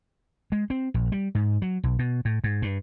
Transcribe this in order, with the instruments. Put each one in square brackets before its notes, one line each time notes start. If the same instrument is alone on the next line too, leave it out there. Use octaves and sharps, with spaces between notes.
[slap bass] G#3
C4
A#1
G3
G#2
F#3
B1
B2
A2
G#2
G2